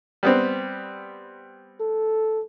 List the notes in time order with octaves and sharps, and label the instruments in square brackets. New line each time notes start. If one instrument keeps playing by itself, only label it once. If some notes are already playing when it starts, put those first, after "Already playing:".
[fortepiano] G3 B3 C4
[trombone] A4